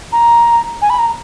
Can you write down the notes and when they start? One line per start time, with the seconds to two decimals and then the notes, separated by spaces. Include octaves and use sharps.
0.12 A#5
0.82 G#5
0.90 B5
0.99 A#5